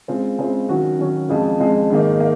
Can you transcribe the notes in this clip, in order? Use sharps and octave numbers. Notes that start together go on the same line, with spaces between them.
C#3 G#3 C4 F4
C#3 G#3 C4 F4
D#3 F#3 C#4 F#4
D#3 F#3 C#4 F#4
F2 C#3 F3 G#3
F2 C#3 F3 G#3
G#2 D#3 A#3
A#3